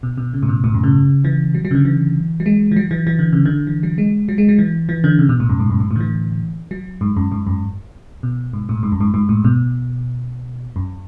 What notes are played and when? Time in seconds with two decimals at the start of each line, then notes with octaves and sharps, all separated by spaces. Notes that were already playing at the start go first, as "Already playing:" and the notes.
0.03 B2
0.18 B2
0.33 C#3
0.43 A2
0.49 B2
0.64 A2
0.74 F#2
0.84 C#3
1.25 E3
1.55 F#3
1.65 F#3
1.71 C#3
1.75 D3
1.85 E3
2.40 F#3
2.46 G#3
2.71 E3
2.76 F#3
2.91 E3
3.07 E3
3.19 D3
3.33 C#3
3.45 D3
3.67 E3
3.83 F#3
3.98 G#3
4.29 F#3
4.38 G#3
4.49 F#3
4.59 E3
4.89 E3
5.04 D3
5.19 C#3
5.29 B2
5.40 A2
5.49 F#2
5.60 G#2
5.70 F#2
5.80 G#2
5.91 A2
5.96 D3
6.00 E3
6.71 F#3
7.01 G#2
7.17 F#2
7.32 G#2
7.47 F#2
8.23 B2
8.53 G#2
8.69 A2
8.83 G#2
8.92 F#2
9.01 G#2
9.14 G#2
9.29 A2
9.45 B2
10.76 F#2